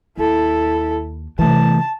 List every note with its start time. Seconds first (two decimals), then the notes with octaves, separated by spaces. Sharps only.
0.18 D#2 E4 A4
1.39 C3 E3 A3 B3 A5